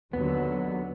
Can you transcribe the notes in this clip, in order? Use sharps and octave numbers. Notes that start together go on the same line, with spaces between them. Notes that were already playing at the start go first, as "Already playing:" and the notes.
D#2 D3 F#3 B3